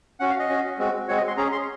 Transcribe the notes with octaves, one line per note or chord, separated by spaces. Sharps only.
C#4 F#4 F#5
F5
D#5
C#4 F#4
G#3 C4 F#4
G#3 C4 F#4 C#5
D#5
C6
C#4 G#4 A#5
C6